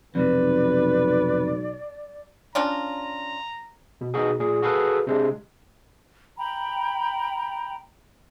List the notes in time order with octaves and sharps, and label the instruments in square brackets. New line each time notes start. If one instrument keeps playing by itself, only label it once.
[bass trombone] B1 [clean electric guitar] F2 G#2 C3 [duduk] B4 [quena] D5
[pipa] C#4 D4 F4 [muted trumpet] A#5
[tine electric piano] B2
B2 D#4 F#4 G#4
A#2 G#4
F#4 G#4 A4 B4 F5
C3 G#3 D4
[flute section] G5 A#5 B5